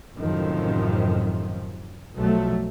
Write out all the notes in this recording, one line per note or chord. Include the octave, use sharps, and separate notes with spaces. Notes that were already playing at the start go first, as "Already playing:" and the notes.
A1 F#2 A2 C3 D#3 F3
B1 F3 F#3 A3